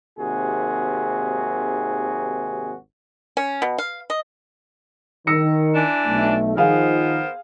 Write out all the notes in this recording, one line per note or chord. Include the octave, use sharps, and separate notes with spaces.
G#1 D#2 C3 F#4 G#4
C#4
B2
F5
D#5
D#3 E6 A#6 C#7
E3 D4
B1 A3
D#3 F3 B3 G#4 A#4 C5 F5